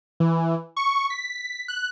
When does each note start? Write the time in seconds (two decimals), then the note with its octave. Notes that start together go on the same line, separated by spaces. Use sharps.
0.20 E3
0.76 C#6
1.10 B6
1.68 F#6